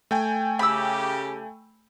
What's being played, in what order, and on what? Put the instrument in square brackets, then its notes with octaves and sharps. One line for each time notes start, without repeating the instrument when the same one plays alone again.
[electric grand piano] A3 G5 G#5
[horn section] C#3 C#4 G4 [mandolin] B5 E6